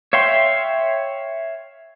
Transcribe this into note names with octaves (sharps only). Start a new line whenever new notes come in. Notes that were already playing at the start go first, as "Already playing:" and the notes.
C#5 E5 F5 G5 C6